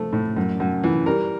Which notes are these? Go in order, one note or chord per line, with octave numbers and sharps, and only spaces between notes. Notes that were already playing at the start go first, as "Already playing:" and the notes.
Already playing: F3 A3
A2
F#2
F#2
E3
G3 A#4